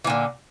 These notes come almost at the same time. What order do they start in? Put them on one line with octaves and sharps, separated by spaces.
E3 A#2 D3